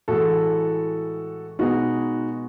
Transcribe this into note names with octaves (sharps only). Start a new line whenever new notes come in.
A2 E3 G#3 F#4 A4
B2 G#3 B3 D#4 F#4